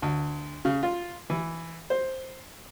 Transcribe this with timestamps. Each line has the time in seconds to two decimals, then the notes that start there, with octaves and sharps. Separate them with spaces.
0.02 D2
0.65 C#3
0.83 F4
1.30 E3
1.90 C5